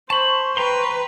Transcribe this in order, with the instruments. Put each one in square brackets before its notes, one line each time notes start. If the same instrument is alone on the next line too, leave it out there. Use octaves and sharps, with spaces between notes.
[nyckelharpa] C5 [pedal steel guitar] A5 B5 [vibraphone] C#6
[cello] B4 [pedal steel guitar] G5 A#5 C6